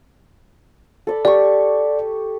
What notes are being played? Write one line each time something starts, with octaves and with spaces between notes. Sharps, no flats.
A4 D5 B5
G4 D5 C#6